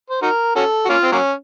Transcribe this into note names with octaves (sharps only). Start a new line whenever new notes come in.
C5
D#4 F#4 A#4
C#4 F#4 A4
F#4
A#3 C#4 F4
C4
F#3 A#3 C#4